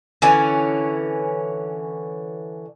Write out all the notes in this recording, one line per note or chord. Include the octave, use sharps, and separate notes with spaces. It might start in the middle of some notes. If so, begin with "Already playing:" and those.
D3 E3 C#4 G#5